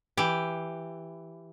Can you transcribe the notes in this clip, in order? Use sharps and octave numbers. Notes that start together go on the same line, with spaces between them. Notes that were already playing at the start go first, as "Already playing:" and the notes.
E3 G4